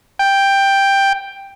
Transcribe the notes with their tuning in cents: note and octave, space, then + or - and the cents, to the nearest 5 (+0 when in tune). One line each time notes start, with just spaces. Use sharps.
G5 +5